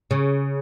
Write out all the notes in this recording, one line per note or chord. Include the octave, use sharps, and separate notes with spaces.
C#3